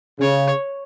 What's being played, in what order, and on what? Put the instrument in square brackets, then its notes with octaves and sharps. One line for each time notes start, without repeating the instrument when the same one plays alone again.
[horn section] C#3 [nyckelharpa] C#5